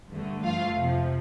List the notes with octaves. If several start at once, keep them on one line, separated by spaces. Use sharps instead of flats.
G2 D3 A3
G2 F3 A3 F4 F5
F2 C3 F3